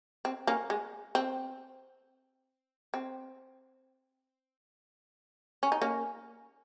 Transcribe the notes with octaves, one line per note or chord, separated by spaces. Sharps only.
C4
A#3 C#4
G#3
C4
C4
C#4
D#4
A#3 C#4